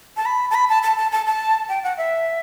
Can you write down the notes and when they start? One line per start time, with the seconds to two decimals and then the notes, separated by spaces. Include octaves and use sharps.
0.17 A5
0.26 B5
0.50 A5
0.55 B5
0.69 A5
0.83 A5
0.97 A5
1.12 A5
1.26 A5
1.69 G5
1.84 F#5
1.98 E5